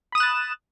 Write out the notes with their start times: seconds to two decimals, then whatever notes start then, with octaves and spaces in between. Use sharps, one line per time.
0.12 B5
0.15 D#6
0.18 E7
0.20 F#6
0.23 A6